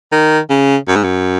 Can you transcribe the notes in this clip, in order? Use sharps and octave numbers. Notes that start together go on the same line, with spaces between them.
D#3
C#3
F#2
G#2
F#2